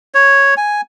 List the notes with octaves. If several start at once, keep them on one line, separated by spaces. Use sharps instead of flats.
C#5
G#5